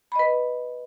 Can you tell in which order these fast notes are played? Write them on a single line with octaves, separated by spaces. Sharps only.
B5 D#5 B4